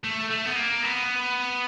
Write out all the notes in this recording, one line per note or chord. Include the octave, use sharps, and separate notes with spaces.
A3
A3
B3
A#3
B3